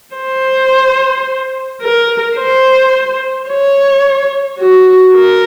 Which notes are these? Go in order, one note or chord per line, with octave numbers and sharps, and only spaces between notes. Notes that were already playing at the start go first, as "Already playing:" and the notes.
C5
A#4
C5
C#5
F#4
A#4